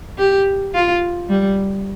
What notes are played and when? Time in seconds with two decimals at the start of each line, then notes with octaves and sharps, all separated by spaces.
0.18 G4
0.74 F4
1.29 G3